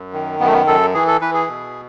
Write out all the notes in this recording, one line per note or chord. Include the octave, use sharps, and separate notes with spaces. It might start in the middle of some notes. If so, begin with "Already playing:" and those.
Already playing: F#2
D#3
F#2 B3
A3
B3
F#2 A4
E3 G#4
A4
E3 B4
G#4
B2